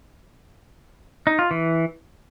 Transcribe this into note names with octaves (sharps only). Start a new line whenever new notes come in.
D#4
F4
E3